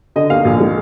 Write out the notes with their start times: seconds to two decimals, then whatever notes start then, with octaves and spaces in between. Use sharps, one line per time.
0.16 D3 D#5
0.30 D#2 F5
0.45 A#1
0.60 G#3